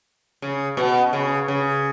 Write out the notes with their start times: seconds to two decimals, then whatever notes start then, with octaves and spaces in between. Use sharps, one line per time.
0.42 C#3
0.77 B2
1.13 C#3
1.48 C#3